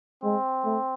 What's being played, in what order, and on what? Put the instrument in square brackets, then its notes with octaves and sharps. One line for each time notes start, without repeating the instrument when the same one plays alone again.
[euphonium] G#3 [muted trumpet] C4
[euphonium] A3